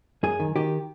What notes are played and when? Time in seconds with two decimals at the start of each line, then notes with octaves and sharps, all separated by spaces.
0.23 F#2 G#4
0.40 D#3
0.56 D#3 G4